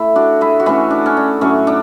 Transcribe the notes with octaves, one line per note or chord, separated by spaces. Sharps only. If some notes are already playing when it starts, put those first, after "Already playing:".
Already playing: A3 E4
D4 F#4
E4 G#4
F#4
E3 A3 C#4 E4 G#4
D4
C#4
D4
A2 F#3 A3 C#4
D4